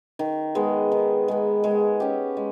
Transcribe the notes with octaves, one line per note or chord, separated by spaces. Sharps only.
D#3
G#3 B3
D#3
G#3 B3
G#3
C#4 G4
G#3